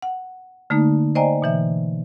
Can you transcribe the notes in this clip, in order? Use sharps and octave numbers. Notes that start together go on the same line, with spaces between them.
F#5
D3 A3 A#3 D#4
C5 D5 D#5 G5 G#5 A#5
B2 E3 E5